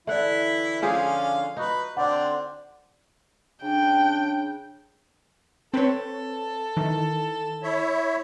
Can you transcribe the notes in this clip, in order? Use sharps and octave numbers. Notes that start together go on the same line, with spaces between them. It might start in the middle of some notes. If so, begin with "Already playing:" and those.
D3 E3 E4 D5 E5 F#5
D3 F3 C#4 G#4 C5 F5
D#4 F#4 B4
D3 C4 D4 D5 F#5
C#3 D4 G5
C4 A4 B4 C#5
D#3 E3
E4 C#5 E5